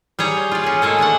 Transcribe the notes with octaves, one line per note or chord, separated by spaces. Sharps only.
G3 G#4 C#5 A#5
F4 D5
C#4 G#4
G#3 A#3 G#4 A4
G#3 A3 D4 F#5